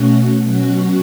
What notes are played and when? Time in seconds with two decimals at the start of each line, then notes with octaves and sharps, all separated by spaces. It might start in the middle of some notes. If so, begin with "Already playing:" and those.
Already playing: B2 A3 C#4 F#4
0.43 B2 F#3 C#4 F#4